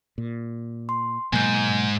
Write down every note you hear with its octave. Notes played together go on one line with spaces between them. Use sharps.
A#2
C6
G#2 B2 F#3 A#3 G#5 G6